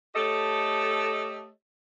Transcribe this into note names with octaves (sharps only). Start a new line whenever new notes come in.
A3 G4 A4 C#5 D#5